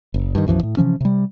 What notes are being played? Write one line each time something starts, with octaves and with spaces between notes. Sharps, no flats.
F#1
G2 D#3
B1 F#2 E3 F3
A2
C3 E3 F3 C#4
C3 G3